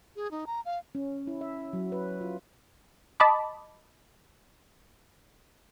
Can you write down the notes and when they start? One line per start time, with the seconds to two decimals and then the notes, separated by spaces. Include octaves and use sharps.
0.16 G#4
0.31 D#4
0.46 A#5
0.65 F5
0.95 C#4
1.27 E4
1.41 E5
1.73 F#3
1.92 B4
2.21 F4
3.20 D#5 A5 B5 D6